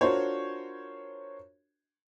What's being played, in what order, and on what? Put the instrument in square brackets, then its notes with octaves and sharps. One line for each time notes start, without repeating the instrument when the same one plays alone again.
[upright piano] D4 F4 F#4 A#4 C5 C#5